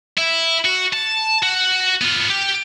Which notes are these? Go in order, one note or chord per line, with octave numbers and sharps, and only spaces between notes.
E4
F#4
A5
F#4
B3 F4
G4